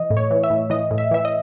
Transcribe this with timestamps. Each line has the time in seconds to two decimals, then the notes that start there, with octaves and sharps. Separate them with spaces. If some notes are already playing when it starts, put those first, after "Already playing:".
Already playing: E3 D#5
0.10 A2
0.17 C#5
0.31 E3
0.43 E5
0.50 A2
0.70 E3 D#5
0.91 A2
0.98 E5
1.11 E3 E5
1.25 D#5